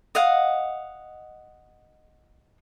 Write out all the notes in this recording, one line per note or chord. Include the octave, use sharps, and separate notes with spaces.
D#5 F5 F#5